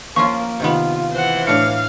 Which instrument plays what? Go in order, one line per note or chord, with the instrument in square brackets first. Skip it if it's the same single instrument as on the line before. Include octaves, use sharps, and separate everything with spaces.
[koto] F3 C#4 F4 [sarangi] A#3 [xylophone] C#6
[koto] C3 D#3 B3 [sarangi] F4
[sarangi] E3 [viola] C5 F#5
[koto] A2 D4 [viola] F5 [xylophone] C#7